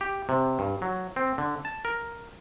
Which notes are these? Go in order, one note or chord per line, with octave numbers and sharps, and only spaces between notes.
G4
C3
G2
F#3
C4
D3
A5
A#4